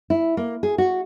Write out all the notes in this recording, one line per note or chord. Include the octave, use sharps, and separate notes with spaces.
E4
A#3
G#4
F#4